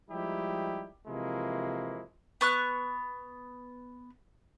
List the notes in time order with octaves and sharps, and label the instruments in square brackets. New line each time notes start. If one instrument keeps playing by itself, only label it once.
[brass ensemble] F3 G3 G#3 D#4 E4 G4
C3 E3 F3 G#3 A#3 E4
[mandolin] B3 C#6 F#6